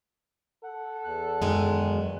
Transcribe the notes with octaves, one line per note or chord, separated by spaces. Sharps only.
A4 F#5
E2 F#6
F#2 B2 D#3 G#3